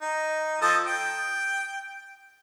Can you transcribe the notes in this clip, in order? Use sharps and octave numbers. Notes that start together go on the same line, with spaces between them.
D#4
F3 A4 D#5
G5